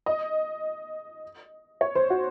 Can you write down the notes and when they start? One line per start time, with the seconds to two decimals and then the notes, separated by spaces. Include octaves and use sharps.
0.06 D#5
1.81 C#5
1.95 C5
2.10 F#4